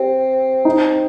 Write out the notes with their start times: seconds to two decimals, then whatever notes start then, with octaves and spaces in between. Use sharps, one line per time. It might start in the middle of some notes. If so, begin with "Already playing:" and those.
Already playing: C4 G4
0.65 D#4